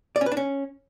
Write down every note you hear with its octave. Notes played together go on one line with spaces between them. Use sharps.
D5
C#4
B4
D4
C#4